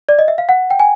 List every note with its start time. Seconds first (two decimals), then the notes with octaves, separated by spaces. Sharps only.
0.09 D5
0.19 D#5
0.28 E5
0.38 F5
0.49 F#5
0.70 G5
0.79 G#5